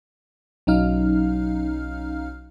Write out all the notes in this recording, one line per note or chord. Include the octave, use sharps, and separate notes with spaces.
B1 F#3 C#4 D#4 F5 F6